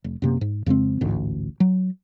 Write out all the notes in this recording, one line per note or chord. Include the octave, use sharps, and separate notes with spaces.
F1
F#2 C3 A#3
G#2
F2 C#3 G#3 C4
A1 D2 G#2
F#3